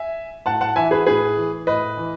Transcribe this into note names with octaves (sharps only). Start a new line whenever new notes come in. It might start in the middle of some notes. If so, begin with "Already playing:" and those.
Already playing: E5 G#5
A2 F#5 A5
F#5 A5
E3 E5 G#5
G#4 B4
A2 G#4 B4
E3
A2 B4 D#5
E3